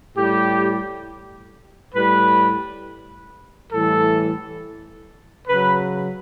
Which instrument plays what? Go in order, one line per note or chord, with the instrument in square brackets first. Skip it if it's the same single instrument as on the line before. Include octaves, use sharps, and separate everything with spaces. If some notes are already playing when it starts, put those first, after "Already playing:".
[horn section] A2 G3 G4
A2 G3 B4
A2 E3 G3 A4
C#3 F#3 B4